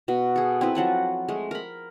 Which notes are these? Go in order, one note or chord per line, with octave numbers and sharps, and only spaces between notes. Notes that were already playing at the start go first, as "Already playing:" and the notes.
B2 F#4
G#4 A4
C4 E4 B4
F3 F#3 F#5 A5
G#3 A3
A#4 B5